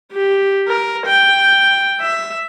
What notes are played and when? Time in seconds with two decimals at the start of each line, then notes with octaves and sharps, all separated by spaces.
0.12 G4
0.68 A#4
1.06 G5
2.01 E5